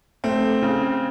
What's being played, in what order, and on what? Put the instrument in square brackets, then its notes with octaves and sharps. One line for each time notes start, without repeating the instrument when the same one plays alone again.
[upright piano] A3 [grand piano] C4
[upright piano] C#3